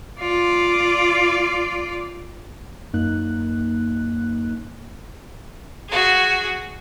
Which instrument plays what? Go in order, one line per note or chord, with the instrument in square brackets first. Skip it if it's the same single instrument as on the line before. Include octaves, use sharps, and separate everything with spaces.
[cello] F4 D5
[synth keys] F#2 A#3 D#4 F#6
[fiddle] F#4 G#4